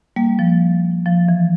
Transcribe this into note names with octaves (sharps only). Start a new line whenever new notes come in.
G3 A#3
F3
F3
E3